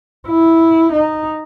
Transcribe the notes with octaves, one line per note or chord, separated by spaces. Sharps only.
E4
D#4